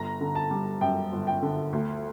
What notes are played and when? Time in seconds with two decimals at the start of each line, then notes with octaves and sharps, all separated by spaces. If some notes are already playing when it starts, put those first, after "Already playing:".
Already playing: G1 A#5
0.21 D3
0.35 A5
0.51 G3
0.81 F#2 G5
1.12 G1
1.27 G5
1.42 D3
1.73 D2